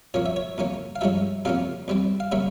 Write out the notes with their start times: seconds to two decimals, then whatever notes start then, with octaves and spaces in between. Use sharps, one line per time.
0.14 A#2 F3 A#3 C#4 C#5
0.26 E5
0.36 C#5
0.58 E2 E3 A#3 C#4
0.96 F5
1.01 G2 F3 G#3 C#4 E5
1.45 E2 C3 F3 A#3 C#4 F5
1.88 E2 E3 G3 C4
2.20 F5
2.32 C#3 G3 A#3 C#4 E5